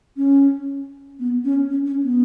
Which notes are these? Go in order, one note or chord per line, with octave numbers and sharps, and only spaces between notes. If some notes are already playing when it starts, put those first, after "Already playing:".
C#4
B3
C#4
C#4
C#4
B3